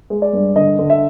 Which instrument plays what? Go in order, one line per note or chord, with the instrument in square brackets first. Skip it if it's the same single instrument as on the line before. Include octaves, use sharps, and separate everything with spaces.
[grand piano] G#3
D5
G2
D3 D#5
D3
E5